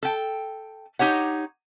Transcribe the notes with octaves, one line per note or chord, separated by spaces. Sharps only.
A4 G5
D#4 G4 C#5 F#5